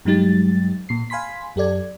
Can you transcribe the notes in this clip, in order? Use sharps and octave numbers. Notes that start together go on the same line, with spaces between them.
G2 F#3 G#3 D#4 G4 A6
A#2 C7
F5 G#5 B5 C6 B6
F#2 G4 A4 D5 G#6